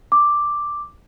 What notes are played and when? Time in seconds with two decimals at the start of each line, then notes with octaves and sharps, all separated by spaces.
0.12 D6